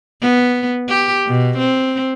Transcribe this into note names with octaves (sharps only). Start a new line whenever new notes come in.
B3
G4
B2
C4